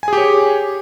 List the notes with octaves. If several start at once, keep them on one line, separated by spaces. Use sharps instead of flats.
G4 G#4 C#5 G#5